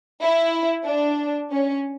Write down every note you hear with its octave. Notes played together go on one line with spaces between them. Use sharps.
E4
D4
C#4